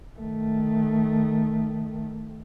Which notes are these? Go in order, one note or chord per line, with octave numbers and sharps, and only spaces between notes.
D#3 A3